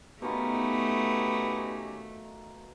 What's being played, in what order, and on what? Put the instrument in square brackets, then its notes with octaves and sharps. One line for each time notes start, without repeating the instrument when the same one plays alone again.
[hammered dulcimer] B2 D#3 F4 [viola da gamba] A3 [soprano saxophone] B3 [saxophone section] C#4 D#4 G4